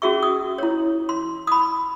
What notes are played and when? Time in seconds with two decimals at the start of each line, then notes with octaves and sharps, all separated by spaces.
0.02 C#4 F#4 G#4 E5 C#6
0.23 D#6
0.58 E4 C#5
1.09 C6
1.47 B5 D#6